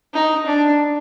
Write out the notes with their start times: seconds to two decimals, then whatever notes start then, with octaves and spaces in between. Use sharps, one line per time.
0.13 D#4
0.46 D4